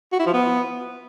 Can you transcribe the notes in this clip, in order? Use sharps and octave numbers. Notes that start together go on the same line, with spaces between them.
F#4
E4
F3
B3